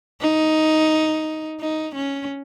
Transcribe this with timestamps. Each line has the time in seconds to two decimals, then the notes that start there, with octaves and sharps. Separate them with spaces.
0.21 D#4
1.61 D#4
1.95 C#4